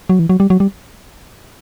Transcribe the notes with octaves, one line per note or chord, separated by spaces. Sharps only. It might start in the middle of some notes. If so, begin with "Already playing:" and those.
F#3
E3
F#3
G3
F#3
G3